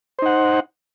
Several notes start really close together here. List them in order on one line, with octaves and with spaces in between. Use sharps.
C5 D#4 F#5